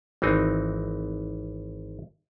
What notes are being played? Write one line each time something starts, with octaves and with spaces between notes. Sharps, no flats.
G#1 E3 C4 D#4